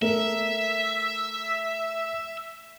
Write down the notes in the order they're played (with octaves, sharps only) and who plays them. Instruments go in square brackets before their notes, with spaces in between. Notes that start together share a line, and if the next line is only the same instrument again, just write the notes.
[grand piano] A3 A#4 [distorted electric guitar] E5